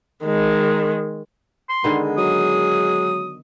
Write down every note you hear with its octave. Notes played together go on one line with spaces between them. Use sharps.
D#3 G#3
C6
D3 D#3 G#3 B3
F#3 D#6